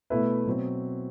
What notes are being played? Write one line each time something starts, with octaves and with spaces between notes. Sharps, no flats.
B2 A3 E4 B4 E5
B2 F#3 C4